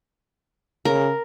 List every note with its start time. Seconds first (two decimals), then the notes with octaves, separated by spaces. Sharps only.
0.85 C#3 A#4